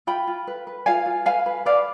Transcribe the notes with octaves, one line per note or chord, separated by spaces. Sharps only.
F4 G5 B5
F4
B4
B4
F4 F5 G#5
F4
B4 F5 G#5
B4
B4 D5 F5